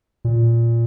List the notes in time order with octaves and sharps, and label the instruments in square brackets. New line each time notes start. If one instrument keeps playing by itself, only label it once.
[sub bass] A#2